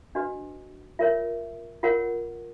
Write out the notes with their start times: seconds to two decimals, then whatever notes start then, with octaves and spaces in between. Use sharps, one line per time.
0.15 D4 F#4 B4 D#5
0.99 F4 A#4 C#5 E5
1.83 F4 A#4 C#5 F#5